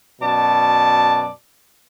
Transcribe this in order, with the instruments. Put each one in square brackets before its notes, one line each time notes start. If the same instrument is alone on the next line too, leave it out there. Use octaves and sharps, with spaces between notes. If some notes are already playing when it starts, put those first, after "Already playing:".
[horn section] F#2 B2 D5 A5